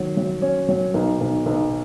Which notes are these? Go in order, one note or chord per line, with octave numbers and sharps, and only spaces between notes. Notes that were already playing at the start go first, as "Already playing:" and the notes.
Already playing: D#3 F#3
F#3
C#4
F#3
B1
B1
B1